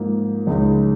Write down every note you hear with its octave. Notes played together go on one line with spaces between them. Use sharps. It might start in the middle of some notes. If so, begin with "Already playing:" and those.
Already playing: G#2 F3 A#3
C#2 C#3 G#3 D#4